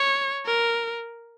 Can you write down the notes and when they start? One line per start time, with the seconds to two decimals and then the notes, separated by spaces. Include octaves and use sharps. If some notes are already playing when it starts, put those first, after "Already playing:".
Already playing: C#5
0.46 A#4